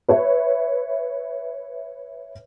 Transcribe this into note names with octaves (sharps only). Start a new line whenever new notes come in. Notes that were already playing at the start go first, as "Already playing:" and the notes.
B4 C#5 E5